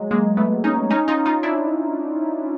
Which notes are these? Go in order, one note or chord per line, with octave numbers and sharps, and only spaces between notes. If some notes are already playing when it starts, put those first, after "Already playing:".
Already playing: F#3 G#3
G#3 A#3
A3 B3
C#4 D#4
C#4 D#4
D#4 F4
D#4 F4
D4 E4